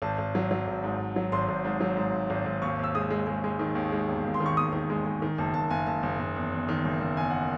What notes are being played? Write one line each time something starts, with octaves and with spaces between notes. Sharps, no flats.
G#1 A5
G#1
F#3
F#3
G#1
G#2
G#1
F#3
G#1 C6
G#1
G#2
F#3
G#2
G#1
G#1
G#1
D#2 C#6
D#2 E6
G#3 D#6
G#3
G#3
G#3
D#3
D#2
G#3
E1
D#2
C6
D#3
C#6
D#2 D#6
D#3
G#3
G#3
D#3
F#1 A5
F#1 A5
F#1 G#5
F#1 A5
F#1
F#1
E2
E2
D#3
F#1
F#1
E2 G#5
F#5